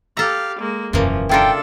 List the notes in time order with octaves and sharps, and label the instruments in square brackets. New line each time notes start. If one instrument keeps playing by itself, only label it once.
[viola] G4 F5 [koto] A4 A#5
[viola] G#3 A#3
[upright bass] E1 F#2 [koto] C#3 E3 A#3 [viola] F3
[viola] D4 A4 [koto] E4 F4 A#4 [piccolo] G5